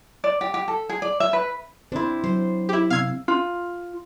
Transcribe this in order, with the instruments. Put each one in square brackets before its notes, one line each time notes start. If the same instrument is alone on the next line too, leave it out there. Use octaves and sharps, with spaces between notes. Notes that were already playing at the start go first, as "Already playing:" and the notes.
[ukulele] D5
G4
G4
A4
G#4
D5
E5
B4
[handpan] C4 C5 [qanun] D4 E4
[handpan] F#3 [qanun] C5
[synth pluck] E4 G4
[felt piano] C3 E6 [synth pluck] F5 G#6 C7
[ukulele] F4